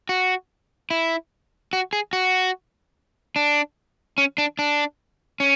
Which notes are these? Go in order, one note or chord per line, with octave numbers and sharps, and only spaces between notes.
F#4
E4
F#4
G#4
F#4
D4
C#4
D4
D4
C#4